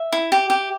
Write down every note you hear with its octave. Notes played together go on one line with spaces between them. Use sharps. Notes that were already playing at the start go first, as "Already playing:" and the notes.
Already playing: E5
E4
G4
G4